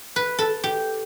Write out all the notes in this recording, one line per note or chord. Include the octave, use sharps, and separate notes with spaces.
B4
A4
G4